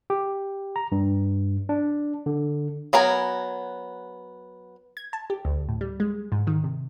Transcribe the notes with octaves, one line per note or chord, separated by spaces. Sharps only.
G4
A#5
G2
D4
D3
F#3 B3 A#4 G#5
G#6
A5
G4
D2
A2
G3
G#3
G#2
D#3
C3